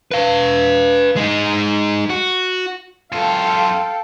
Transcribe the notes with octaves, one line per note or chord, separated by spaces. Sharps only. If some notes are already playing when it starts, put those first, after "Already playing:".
B4 F5
G#3 D#4
F#4
F#2 F4 A4 F5 G5